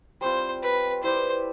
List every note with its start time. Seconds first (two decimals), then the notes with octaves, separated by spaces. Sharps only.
0.21 G3 C4 F4 C5
0.63 B4
1.03 E4 G4 B4 C5 D5